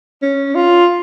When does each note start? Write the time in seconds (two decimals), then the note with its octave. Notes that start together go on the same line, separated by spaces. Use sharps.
0.22 C#4
0.55 F4